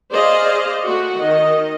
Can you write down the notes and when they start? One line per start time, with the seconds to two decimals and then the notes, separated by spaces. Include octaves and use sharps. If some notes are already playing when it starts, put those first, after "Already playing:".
0.12 G#4 C5 D5 D#5 F5
0.86 A3 F#4
1.20 D#3 D#5